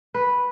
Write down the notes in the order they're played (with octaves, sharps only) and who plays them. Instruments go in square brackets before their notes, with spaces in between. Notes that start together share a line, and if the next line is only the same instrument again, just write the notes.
[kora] B4